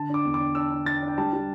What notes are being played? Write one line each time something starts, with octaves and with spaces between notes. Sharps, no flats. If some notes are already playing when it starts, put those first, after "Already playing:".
Already playing: D3 A5
D4 D6
E2
D6
D4
D4 E6
D4
D4 A6
D4
G5
G3 A5
G3